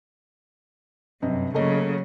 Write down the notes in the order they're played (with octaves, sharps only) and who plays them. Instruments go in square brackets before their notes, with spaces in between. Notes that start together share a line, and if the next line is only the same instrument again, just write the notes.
[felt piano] G1 C3 D#5 [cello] F#2
[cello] C#3 F#3 [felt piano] A3 A#3 D#5